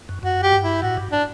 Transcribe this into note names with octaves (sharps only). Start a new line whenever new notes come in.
F#2
F#2 F#4
G4
G2
E4
A2 F#4
G2
D4